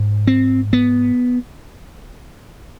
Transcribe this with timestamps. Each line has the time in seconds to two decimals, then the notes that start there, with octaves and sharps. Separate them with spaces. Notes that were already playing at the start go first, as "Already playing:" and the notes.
Already playing: G#2
0.27 C4
0.73 B3